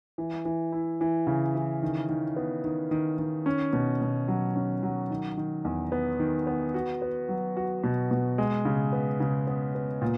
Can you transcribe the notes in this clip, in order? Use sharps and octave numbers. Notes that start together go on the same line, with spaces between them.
E3
E3
E4
E3
C#3
E3
D#3
D#3
B3
D#3
D#3
D#3
C#4
B2
B2
F#3
C#4
F#3
D#3
D#3
E2
B3
D#3
B3
F#4
B3
F#3
F#4
B2
B2
G#3
C#3
B3
C#3
B3
B3
A#2